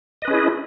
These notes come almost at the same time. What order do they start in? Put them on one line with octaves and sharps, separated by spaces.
D#5 B4 C#4 G#4 E4